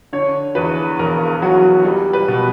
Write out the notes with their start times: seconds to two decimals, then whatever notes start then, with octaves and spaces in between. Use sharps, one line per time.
0.13 D3 C#5
0.55 E2 B4
0.99 E1 A#4
1.42 F#3 F#4
1.85 G3
2.13 B4
2.28 B2